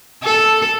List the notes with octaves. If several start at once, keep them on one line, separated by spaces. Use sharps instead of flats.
A4